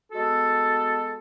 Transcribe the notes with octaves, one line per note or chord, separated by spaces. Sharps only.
G#3 B3 F#4 A4